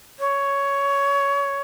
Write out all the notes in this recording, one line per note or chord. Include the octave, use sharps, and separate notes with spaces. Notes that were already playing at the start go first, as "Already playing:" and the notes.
C#5